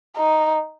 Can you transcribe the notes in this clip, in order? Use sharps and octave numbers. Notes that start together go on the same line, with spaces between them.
D#4